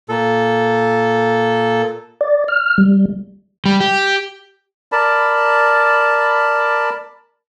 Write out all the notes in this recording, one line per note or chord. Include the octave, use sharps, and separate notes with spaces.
A#2 A4
D5
F6
G3
G3
G4
A#4 D5 A5 B5